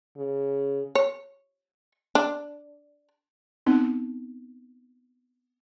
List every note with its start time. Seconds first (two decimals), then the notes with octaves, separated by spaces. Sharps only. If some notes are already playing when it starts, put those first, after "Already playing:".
0.17 C#3
0.95 C#5
2.15 D4
3.66 B3 C4 D#4